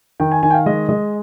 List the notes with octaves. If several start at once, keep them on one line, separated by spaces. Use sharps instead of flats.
D#3 G5
G#5
D#3 G#5
G5
F5
G#3 D#5
G#3 D#5